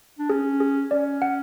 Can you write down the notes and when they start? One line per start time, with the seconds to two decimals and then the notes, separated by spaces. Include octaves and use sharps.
0.19 D4
0.30 C#4 G#4
0.60 G#4
0.91 C#4 D5
1.22 F#5